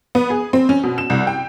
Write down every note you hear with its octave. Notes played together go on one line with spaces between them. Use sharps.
B3
G#4
C4
C#4
B2
E7
C2
G5